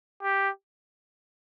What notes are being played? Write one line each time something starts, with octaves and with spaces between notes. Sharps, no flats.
G4